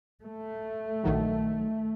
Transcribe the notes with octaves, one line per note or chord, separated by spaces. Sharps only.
A3
A#1 D#3 F#3